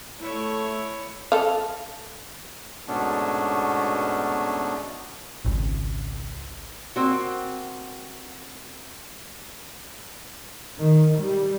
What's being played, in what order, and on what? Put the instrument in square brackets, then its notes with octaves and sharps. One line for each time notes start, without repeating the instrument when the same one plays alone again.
[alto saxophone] A3 [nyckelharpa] E4 C#5
[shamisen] A4 F5
[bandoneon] G#2 B2 A3 B3 C#4 D4
[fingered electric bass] G#1 C#2 C#3
[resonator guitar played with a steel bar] A#3 C4 F#4
[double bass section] D#3
G3